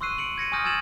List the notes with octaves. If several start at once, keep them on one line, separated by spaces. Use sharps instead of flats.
C6 C#6 E6 F#6 C7 D#7
C#7 D7 F#7
G#6 A#6 C#7 D#7
G#5 C#6 D#6 F6 G6 A#6
G#5 E6 G#6 A6 E7 F#7